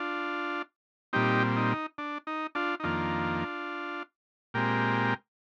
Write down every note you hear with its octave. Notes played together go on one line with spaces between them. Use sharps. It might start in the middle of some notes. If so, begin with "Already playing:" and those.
Already playing: D4 F4
A#2 G3 C4 D#4 G4
D#4
D4
D#4
D4 F4
D#4
F2 D#3 A#3 D4 F4
A#2 G#3 C4 G4 A#4